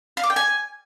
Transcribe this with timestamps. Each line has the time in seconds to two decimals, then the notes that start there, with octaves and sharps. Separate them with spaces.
0.17 F5
0.23 D6
0.30 G5
0.36 G#5